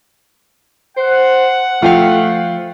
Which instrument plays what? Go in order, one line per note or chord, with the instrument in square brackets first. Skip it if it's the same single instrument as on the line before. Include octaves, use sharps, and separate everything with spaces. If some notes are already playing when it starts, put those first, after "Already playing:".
[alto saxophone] C5 [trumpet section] F#5
[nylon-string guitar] F3 F5 [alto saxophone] A3 [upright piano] F4 G5